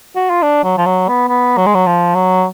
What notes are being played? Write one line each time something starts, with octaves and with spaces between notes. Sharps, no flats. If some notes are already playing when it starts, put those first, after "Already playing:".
F#4
F4
D4
F#3
F3
F#3
B3
B3
F#3
G#3
F#3
F3
F#3